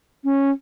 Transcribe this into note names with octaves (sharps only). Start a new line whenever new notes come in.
C#4